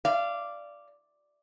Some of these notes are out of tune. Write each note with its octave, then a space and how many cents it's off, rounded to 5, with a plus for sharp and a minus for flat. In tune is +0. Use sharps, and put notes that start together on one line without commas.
D5 +0 F5 -25